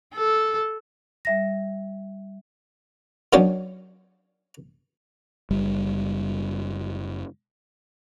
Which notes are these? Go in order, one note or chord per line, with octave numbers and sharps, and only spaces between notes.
A4
G3 E5 A#6
D#3 F3 F#3 C#4 D4
F#1 G3